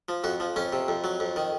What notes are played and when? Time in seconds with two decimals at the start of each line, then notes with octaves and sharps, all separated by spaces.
0.09 F3
0.24 F2 F#4
0.40 F3
0.56 F2 C#4
0.73 C3
0.88 F2
1.04 F#3
1.20 F2
1.36 D#3